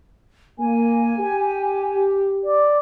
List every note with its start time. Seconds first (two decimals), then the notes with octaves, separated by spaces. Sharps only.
0.59 A#3 G#5
1.18 G4
2.44 D5